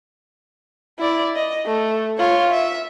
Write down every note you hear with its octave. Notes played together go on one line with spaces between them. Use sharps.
E4 D5
D#5
A3
F4 C#5
E5